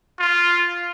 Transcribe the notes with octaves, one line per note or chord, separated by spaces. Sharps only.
F4